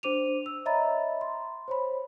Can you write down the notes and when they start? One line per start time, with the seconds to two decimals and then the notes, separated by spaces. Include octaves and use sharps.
0.03 D4 C5 D6 D#7 F7
0.46 E6
0.65 C#5 D#5 E5 A#5 B5 A6
1.21 C6
1.68 C5 C#5 B5